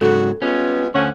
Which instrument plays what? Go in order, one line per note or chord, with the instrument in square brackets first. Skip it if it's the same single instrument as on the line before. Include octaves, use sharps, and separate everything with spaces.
[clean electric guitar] G#2 C#3 F#3 [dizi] F#4 [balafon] A4
[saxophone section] G3 G#3 B3 [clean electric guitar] C#4 [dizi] F4
[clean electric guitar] D2 F#5 [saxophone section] D3 F3 C#4 [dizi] C5